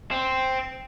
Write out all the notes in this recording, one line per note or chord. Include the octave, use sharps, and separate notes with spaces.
C4